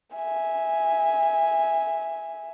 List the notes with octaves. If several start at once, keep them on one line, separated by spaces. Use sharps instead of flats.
E5 G#5